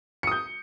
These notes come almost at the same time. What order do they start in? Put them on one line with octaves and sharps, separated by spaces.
C#7 D#6 G6